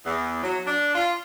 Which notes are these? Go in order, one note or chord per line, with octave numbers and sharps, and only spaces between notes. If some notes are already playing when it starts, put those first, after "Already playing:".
E2
F#3
D4
F4